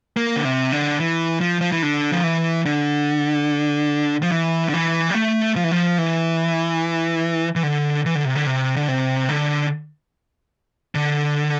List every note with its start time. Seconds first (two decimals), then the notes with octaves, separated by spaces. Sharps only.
0.17 A#3
0.36 D3
0.45 C3
0.72 D3
1.00 E3
1.41 F3
1.61 F3
1.72 E3
1.83 D3
2.12 F3
2.24 E3
2.65 D3
4.22 F3
4.31 E3
4.69 D3
4.73 E3
5.10 G3
5.14 A3
5.56 F3
5.64 E3
5.71 F3
5.98 E3
7.56 E3
7.63 D3
8.06 E3
8.15 D3
8.25 C3
8.35 D3
8.46 C3
8.76 D3
8.88 C3
9.29 D3
10.95 D3